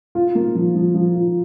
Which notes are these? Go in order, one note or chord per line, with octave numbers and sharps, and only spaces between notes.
F4
A#3
F3
F3
F3
F4